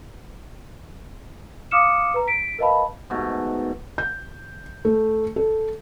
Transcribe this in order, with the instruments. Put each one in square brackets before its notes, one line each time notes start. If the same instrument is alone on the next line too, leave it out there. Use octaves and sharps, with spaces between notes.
[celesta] F5 D6 D#6 F6 C#7 E7
B4 A#5
B6 D7
A#4 B4 D#5 F5 A5 B5
[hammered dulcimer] G#2 B2 A3
[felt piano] G6
A3
A4